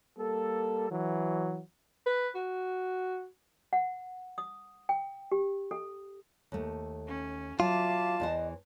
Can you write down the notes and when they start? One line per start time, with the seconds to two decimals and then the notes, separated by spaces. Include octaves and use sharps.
0.18 G3 A#3 A4
0.90 E3 F#3
2.06 B4
2.35 F#4
3.73 F#5
4.38 D#6
4.89 G5
5.32 G4
5.71 A4
6.52 D#2 A3
7.07 C#4
7.60 F#3 F4 E5 F5 A5 D6
8.20 E2 E3 C5 D#5